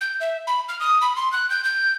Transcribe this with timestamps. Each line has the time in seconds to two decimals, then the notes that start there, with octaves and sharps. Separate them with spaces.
0.01 G6
0.21 E5
0.47 B5
0.69 F6
0.80 D#6
1.01 B5
1.16 C6
1.33 F#6
1.50 G6
1.65 G6